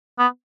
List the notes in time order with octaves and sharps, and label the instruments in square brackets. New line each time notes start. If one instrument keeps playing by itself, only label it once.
[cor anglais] B3